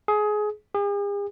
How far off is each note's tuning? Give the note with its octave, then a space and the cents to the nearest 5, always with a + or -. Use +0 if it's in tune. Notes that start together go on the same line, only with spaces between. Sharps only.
G#4 +20
G#4 -45